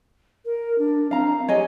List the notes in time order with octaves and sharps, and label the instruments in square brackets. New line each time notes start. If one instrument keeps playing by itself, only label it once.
[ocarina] A#4
D4
[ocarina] C4 [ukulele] F5 A#5
[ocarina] G4 [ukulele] C#5 D#5 G#5